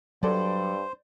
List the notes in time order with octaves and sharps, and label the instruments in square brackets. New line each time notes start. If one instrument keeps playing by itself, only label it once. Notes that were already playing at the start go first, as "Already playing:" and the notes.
[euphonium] G2 [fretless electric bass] F#3 [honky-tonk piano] A4 D5 [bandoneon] C5